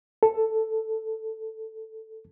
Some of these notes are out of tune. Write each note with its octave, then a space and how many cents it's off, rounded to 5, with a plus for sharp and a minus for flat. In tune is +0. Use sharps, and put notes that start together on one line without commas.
A4 +5